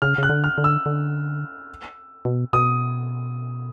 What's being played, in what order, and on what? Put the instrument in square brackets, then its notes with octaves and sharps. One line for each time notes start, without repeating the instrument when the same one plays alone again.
[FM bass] C#3 [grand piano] F6
[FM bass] C#3 [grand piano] F#6
[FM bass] D3
[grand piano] F6
[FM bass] D3
[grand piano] E6
[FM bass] D3
B2
[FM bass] B2 [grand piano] D#6